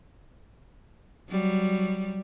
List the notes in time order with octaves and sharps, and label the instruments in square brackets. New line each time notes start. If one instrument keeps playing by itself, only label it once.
[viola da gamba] F#3 G3